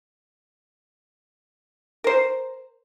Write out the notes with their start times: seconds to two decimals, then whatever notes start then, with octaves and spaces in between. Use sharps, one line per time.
2.04 A#4 C5